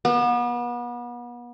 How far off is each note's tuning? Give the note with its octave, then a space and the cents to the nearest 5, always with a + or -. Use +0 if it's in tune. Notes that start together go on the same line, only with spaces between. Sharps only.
B3 -35